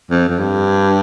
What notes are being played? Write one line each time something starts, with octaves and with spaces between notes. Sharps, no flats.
F2
F2
G2